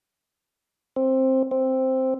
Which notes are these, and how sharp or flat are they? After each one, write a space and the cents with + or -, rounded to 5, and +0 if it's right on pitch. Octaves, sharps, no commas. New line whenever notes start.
C4 +10
C4 +0